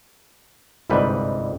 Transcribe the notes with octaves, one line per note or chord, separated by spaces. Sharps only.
G1 C2 G#2 G3 B4